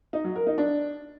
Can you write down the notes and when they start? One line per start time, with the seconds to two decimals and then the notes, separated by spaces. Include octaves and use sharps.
0.13 D#4
0.24 F#3
0.36 A#4
0.47 D#4
0.58 D4